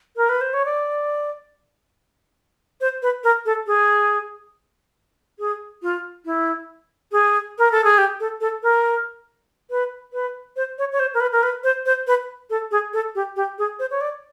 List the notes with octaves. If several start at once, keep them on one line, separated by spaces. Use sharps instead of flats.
A#4
B4
C5
C#5
D5
C5
B4
A#4
A4
G#4
G#4
F4
E4
G#4
A#4
A4
G#4
G4
A4
A4
A#4
B4
B4
C5
C#5
C#5
C5
A#4
B4
A#4
B4
C5
C5
B4
A4
G#4
A4
G4
G4
G#4
C5
C#5
D5